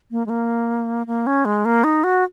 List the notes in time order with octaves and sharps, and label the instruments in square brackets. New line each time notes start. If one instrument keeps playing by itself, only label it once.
[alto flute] A#3
G#3
A#3
A#3
C#4
G#3
A#3
D#4
F#4